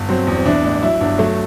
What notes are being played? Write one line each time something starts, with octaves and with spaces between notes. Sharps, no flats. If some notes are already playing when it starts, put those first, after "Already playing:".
Already playing: G1
F#3 C4
E2
C4
E3 D4
A1
F#3 E4
G1 D4
F#3 A3